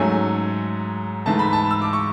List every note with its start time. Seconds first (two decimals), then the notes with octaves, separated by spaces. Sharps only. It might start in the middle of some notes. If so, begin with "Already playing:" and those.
Already playing: G#2 F#3 A3 C#4 G#5
1.26 G#2 E3 A3 A5
1.39 B5
1.53 A5
1.71 E6
1.82 D6
1.93 C#6